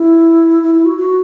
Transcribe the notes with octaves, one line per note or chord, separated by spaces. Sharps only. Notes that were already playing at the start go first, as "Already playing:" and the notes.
Already playing: E4
E4
E4
F#4
F#4